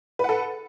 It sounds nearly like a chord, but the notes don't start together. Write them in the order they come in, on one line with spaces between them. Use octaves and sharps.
B4 F#5 A4